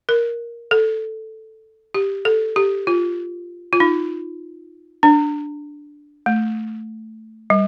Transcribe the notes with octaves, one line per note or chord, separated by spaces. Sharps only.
A#4
A4
G4
A4
G4
F4
F4
D#4
D4
A3
G3